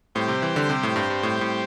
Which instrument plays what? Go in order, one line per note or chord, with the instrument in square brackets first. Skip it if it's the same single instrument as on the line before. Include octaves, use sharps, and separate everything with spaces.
[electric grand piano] A2 [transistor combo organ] G3 C4 G4 C5
[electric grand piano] C3
E3
D3
C3
A2
G2
G2
A2
A2